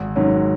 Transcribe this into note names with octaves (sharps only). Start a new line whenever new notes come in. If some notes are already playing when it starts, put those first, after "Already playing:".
Already playing: G#1
G#2 D#3 F#3 C#4